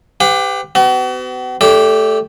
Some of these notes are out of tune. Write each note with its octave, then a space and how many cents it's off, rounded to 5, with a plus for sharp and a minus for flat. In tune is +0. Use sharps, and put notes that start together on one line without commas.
G4 +10 B4 +40 F#5 -35
B3 +40 F#4 +40
A3 -10 G4 +0 D5 -45